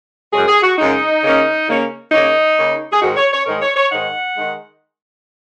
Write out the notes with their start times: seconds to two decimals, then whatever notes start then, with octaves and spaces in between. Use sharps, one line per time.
0.32 F#2 C#3 G#3 G#4
0.48 G#4
0.63 F#4
0.78 F#2 C#3 G#3 D#4
1.22 C#3 A#3 C#4
1.67 C#3 A#3 C#4
2.12 C#3 A#3 C#4 D#4
2.57 C#3 A#3 C#4
2.92 G#4
3.01 G#2 D#3 G#3 D#4 F#4
3.17 C#5
3.32 C#5
3.46 G#2 D#3 G#3 D#4 A#4
3.62 C#5
3.76 C#5
3.91 G#2 D#3 G#3 D#4 F#5
4.36 D#3 G#3 D#4